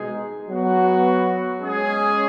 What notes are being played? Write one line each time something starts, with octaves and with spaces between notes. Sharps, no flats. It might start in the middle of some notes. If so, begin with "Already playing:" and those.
Already playing: B2 G#3 D#4 G#4
F#3 B3 F#4
G#3 C#4 G#4